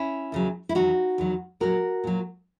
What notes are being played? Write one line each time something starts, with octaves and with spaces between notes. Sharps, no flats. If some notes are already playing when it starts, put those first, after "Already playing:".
Already playing: C#4 E4
D#2 C#3 F#3
E4
E2 D#3 F#3 D#4 F#4
E2 D#3 F#3
A#2 F#3 F#4 A#4
A#2 F#3